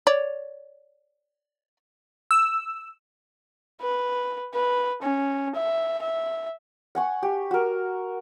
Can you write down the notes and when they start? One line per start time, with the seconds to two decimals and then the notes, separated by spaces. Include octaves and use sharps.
0.07 C#5 D5
2.31 E6
3.82 B4
4.54 B4
5.02 C#4
5.55 E5
6.02 E5
6.95 F#5 G#5 C#6
7.23 G4
7.51 F#4 A#4